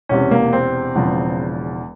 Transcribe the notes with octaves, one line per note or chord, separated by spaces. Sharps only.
E1 E2 C3 C#4
A#3
C4
E1 E2 C#3 F3